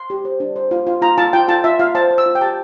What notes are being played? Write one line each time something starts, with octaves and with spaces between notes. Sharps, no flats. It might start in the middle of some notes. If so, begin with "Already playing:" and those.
Already playing: C6
G4
C5
D4
C5
F4
F4
F4 A#5
F4 A5
F4 G5
F4 A5
F4 E5
F4 F5
C5 A5
C5
E6
F4
G5
G4 A5